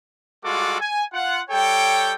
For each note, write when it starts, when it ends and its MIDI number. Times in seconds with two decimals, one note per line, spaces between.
0.44 0.77 55
0.44 0.77 56
0.44 0.77 65
0.44 0.77 66
0.44 0.77 69
0.44 0.77 86
0.80 1.04 80
1.13 1.40 65
1.13 1.40 78
1.50 2.15 55
1.50 2.15 69
1.50 2.15 73
1.50 2.15 79